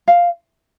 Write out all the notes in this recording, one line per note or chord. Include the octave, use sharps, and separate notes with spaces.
F5